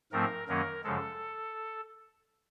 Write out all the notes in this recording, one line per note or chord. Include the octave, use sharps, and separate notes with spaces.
G#2 F3 A3 C4 A#4
F#2 D#3 F#3 A#3 C#4 A#4
F#2 C#3 F3 G#3 A4